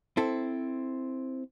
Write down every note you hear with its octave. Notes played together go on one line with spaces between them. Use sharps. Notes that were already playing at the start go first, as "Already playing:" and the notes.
C4 E4 A4